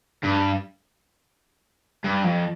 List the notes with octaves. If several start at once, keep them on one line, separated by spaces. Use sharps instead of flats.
G2
G2
F2